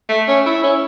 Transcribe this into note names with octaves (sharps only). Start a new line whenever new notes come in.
A3
C#4
E4
C#4